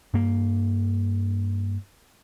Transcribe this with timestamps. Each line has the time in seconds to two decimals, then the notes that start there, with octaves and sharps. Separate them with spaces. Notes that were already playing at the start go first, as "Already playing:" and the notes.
0.14 G2 A#3